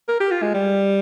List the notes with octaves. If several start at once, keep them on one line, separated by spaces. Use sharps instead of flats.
A#4
G4
F4
G#3
G3